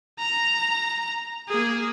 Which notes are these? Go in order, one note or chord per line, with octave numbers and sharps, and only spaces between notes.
A#5
A#3 G#4